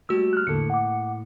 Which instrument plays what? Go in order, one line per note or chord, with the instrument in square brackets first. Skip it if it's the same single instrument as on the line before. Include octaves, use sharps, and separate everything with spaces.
[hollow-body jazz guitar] G3 A3 A#3 [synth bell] F#4 E6
[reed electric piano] F6 F#6
[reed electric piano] E2 D3 A4 [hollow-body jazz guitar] A2 A#3 [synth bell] C#7
[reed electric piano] F#5 D6